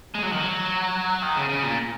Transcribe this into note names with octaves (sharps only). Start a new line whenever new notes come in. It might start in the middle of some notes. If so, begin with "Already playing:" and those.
G#3
F#3
D#3
F#3
D#3
C#3
C#3
A#2